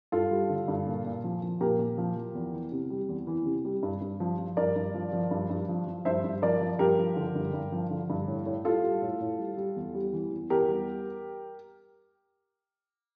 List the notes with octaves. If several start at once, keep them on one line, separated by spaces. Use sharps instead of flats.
G2 F4 A4
G3
D3
G2
A#2
A#2
F3
F3
A#2 G4 A#4
A#2
F3
F3
E2
E3
C3
G3
E2
E3
C3
G3
G2
G2
F3
F3
G2 A#4 D5
G2
F3
F3
G2
G2
F3
F3
G2 C5 E5
G2
F3 A#4 D5
F3
G2 G4 A#4
F3
D3
G2
G2
F3
D3
G2
A2
A2
G3 F4 A4
G3
A2
A2
G3
G3
E2
G3
E3
E2
E2 G4 A#4
G3